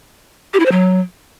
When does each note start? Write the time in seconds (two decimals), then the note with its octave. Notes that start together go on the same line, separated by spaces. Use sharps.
0.54 G4
0.60 E4
0.66 C5
0.72 F#3